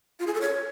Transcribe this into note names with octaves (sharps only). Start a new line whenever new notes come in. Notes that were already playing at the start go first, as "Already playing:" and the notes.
F4
G#4
A4
C#5